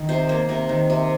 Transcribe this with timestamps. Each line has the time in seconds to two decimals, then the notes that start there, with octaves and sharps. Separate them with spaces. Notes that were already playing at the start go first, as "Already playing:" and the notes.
Already playing: D#3
0.09 C3 C5
0.29 A#3 C5
0.49 C3 A#4
0.69 D#3
0.90 C3